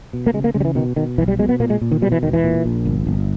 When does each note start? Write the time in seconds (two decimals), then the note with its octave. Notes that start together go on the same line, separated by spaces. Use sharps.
0.13 B2
0.26 A#3
0.34 C#3 G#3
0.44 A#3
0.54 C#3 G#3
0.60 G3
0.65 E3
0.75 B2 D#3
0.96 B2 D#3
1.18 B1 E3
1.28 G3
1.39 B2 G#3
1.49 B3
1.60 A#2 A#3
1.70 G#3
1.81 A#2
1.91 D#3
2.02 B2 G3
2.12 E3
2.22 E1 D#3
2.33 E3
2.44 A#2
2.66 A#1
2.85 G1
3.07 G1